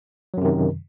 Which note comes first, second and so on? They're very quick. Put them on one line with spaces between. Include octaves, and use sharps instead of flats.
F#3 F#2 C3 D#3